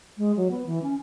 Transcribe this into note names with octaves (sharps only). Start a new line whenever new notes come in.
G#3
F#3
B3
E3
C#4